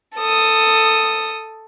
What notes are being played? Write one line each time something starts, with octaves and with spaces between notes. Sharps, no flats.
A4 D#6